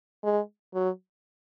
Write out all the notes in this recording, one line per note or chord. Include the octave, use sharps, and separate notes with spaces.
G#3
F#3